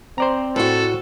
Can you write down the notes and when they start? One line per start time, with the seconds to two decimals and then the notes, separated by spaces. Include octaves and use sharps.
0.18 C4 C5 D5 A#5
0.56 A2 F#4 A4